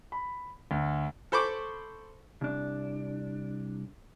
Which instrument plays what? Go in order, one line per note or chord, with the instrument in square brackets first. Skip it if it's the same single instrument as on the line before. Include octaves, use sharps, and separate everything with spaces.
[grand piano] B5
D2
[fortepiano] A4 C5 B5 C#6 D6
[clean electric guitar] C2 D4